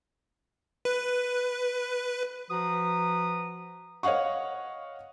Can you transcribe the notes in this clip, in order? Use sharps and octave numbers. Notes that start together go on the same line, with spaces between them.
B4
F3 F#4 B4 A#5 D#6
C#5 D#5 F5 F#5 C#6